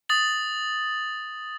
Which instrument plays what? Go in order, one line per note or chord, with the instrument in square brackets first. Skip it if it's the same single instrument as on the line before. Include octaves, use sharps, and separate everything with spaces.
[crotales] D#6 A6 F#7